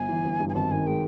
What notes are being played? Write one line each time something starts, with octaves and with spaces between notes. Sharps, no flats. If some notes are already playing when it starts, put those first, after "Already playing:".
Already playing: G1 G#5
E3
G1
G2
G#5
G#1 A5
D#3 G#5
G#3 G5